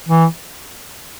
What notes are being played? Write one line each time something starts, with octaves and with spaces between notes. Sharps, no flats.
E3